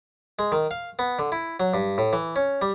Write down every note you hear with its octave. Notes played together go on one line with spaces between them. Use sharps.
G#3
D#3
F5
B3
D3
E4
F#3
G2
A2
E3
C#4
G3